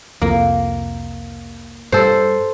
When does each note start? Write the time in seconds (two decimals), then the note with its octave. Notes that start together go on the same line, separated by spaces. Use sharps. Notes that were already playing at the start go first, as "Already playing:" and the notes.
0.22 C2 F2 A#3
1.92 G2 A4 C5